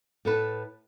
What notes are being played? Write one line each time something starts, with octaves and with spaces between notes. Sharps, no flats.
A2 A4 B4